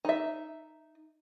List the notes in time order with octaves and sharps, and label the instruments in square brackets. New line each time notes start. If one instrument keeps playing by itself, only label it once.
[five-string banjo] D#4 E5